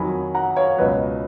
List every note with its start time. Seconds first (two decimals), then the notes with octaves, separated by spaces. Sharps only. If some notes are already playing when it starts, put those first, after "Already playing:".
Already playing: F2 D#3 F#3 G#5 B5
0.35 F#5 A#5
0.57 C#5 F5
0.77 C#2 B2 F#3 B4 D#5